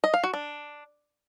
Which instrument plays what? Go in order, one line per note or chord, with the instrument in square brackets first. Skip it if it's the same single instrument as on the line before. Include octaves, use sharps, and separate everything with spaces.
[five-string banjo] D#5
F5
F#4
D4